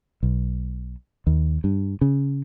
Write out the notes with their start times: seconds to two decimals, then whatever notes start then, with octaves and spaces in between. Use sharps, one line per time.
0.23 B1
1.27 D#2
1.64 G2
2.01 C#3